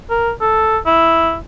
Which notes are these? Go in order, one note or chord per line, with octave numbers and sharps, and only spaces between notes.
A#4
A4
E4